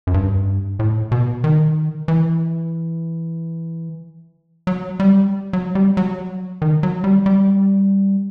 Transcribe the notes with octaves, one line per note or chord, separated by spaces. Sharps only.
F#2
G2
A2
B2
D#3
E3
F#3
G3
F#3
G3
F#3
D#3
F#3
G3
G3